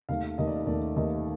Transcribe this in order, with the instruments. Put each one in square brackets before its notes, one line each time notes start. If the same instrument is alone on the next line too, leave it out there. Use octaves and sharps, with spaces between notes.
[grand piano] D#2 D#3 A3 F5
F5
D#2 D#3 A3 D#5
D5
D#2 D#3 A3 D5
D#2 D#3 A3 D#5